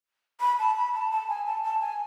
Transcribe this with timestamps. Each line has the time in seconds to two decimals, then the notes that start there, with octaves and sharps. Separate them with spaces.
0.41 B5
0.59 A5
0.76 B5
0.94 A5
1.11 A5
1.29 G#5
1.46 A5
1.63 A5
1.81 G#5